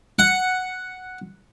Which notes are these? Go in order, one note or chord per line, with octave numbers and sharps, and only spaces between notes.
F#5